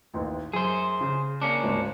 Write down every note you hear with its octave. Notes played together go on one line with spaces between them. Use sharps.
A1 D#2
F#2 G#4 C5
C#3
A#3 C#4 D4
G#1 D2